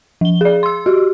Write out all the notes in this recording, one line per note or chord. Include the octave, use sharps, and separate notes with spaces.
F3 G7
G#4 D5
C6 E6
F#4 G4